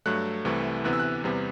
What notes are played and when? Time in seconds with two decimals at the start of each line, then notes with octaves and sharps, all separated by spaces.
0.06 G2 F#3 A3 F#6
0.45 C2 C3 E3 A3
0.84 D2 C3 E3 B3 F#6
0.93 E6
0.99 F#6
1.24 E2 C3 G3 B3